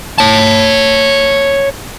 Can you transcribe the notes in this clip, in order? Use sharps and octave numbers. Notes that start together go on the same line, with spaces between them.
C#5 A5